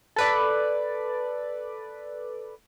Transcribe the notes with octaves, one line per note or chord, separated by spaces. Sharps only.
A4 B4 D5